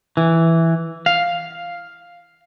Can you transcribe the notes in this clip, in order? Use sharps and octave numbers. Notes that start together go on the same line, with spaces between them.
E3
F5